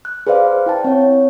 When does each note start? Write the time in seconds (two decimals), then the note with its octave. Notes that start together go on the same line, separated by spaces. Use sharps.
0.05 F#6
0.27 G#4 B4 C5 D5 F5
0.66 E4 G5 A5
0.84 C4 C#5